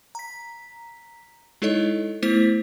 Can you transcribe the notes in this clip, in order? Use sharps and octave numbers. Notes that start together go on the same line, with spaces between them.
A#5 B6
G#3 D#4 E4 A4 C#5 D#5
A3 B3 E4 C5 B6